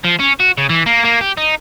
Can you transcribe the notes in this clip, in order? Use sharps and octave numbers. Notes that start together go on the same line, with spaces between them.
F3
C#4
F#4
C#3
E3
A#3
A#3
G4
D#4